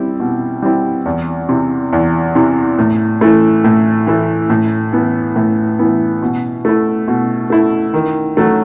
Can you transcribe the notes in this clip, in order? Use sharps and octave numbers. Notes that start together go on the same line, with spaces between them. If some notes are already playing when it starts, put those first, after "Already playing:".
Already playing: G3 C4 E4
B2
G3 C4 E4
E2
C3 E3
E2
C3 E3
A2
E3 A3 E4
A2
E3 A3 E4
A2
E3 B3
A2
E3 B3
B2
A3 E4
B2
A3 E4
D#3
F#3 A3